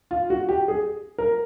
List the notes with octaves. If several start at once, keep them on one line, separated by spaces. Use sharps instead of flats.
F4
F#4
G4
G#4
A#4